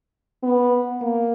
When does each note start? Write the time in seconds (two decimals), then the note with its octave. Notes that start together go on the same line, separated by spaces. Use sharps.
0.43 B3
1.02 A#3